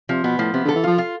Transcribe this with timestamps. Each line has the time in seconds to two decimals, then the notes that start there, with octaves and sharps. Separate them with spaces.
0.09 C3 F3
0.24 B2 B3
0.38 A2 F3
0.54 C3 B3
0.65 D3 A4
0.76 E3
0.84 F3 F4
0.98 F4